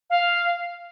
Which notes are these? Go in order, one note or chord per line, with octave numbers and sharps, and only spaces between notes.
F5